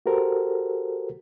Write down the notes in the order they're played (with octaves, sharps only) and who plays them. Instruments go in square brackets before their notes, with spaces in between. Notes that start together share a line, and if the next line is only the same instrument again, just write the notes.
[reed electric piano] F#4 G4 A4 A#4 C5